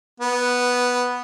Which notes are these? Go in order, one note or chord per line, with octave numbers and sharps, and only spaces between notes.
B3